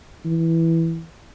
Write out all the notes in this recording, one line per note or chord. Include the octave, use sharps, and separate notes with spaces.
E3